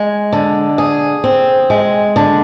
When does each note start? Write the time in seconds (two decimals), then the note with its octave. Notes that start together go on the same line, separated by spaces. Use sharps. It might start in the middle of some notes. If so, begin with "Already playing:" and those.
Already playing: G#3
0.32 D3
0.78 G#4
1.24 C4
1.70 G#3
2.16 D3